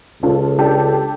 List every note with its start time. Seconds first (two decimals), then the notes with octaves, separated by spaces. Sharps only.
0.23 C#2 C#4 F4 A4
0.58 D4 G4 A4